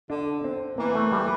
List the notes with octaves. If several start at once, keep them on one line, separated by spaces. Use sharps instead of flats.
D3 D4
C4
E3 A#3
A3
G3